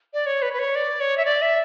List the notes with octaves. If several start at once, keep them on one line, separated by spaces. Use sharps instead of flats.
D5
C#5
B4
B4
C#5
D5
C#5
E5
D5
E5